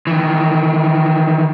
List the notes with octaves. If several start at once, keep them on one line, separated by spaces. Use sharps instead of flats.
D#3 E3